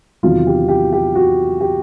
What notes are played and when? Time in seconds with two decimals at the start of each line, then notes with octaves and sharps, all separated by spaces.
0.23 E2 C3 D#3 F#3 F4
0.47 G4
0.68 G4
0.93 G4
1.15 F#4
1.61 G4